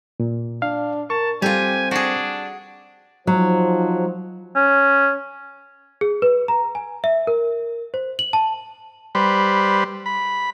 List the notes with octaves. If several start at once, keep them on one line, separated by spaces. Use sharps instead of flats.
A#2
D4 F5
A#4 A5 C#6
G3 C4 F4 G4 A4 G#5
D4 F#4 G#4
F3 F#3 D#4 C5
C#4
G#4
B4
A#5
G#5
E5
A#4
C5
F#7
A5
G3 B4 C5
B5